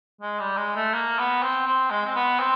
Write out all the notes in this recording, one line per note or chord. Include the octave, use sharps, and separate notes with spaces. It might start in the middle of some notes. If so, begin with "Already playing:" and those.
G#3
G3
G#3
A3
A#3
B3
C4
C4
G#3
C4
B3
C4